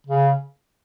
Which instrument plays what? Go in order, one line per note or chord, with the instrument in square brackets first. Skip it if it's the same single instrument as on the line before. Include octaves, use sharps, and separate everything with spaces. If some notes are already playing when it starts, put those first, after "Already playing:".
[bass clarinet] C#3